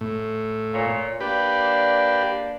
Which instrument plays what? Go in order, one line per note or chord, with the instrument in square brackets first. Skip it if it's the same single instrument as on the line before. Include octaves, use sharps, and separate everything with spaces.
[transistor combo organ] A2
[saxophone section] A#2 C#5
[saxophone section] A#3 D4 D5 [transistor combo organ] G4 B4